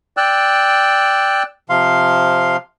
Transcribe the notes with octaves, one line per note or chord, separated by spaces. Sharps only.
D5 G5 E6 F#6
C3 F3 F5 C6